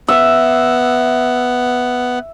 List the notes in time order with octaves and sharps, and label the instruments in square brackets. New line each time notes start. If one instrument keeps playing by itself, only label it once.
[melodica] B3 [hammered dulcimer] E5